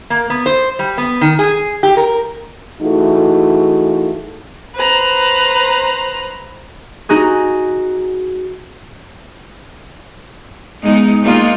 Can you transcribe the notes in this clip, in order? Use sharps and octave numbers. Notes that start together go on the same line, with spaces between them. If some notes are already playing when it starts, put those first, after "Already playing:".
A#3
B3
C5
G3
B3
D#3
G#4
G4
A#4
E3 A3 D#4 F4 F#4 G#4
B4 C5 A#5
D#4 F#4 G#4
G#3 B3 D#4
G3 G#3 A#3 D#4 F4